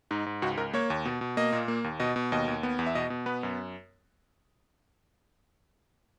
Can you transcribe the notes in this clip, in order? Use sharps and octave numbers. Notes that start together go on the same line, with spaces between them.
G#2 D#4
G#2
C#2 F#4
C#2 A#4
A#3 C#5
D#2
B2
B2
A#3 D#5
A#2
A#3
D#2
B2 D#5
B2
D#2 D#5
D#2
B3
E2
E5
B2 D#5
B2
B3 B4
F#2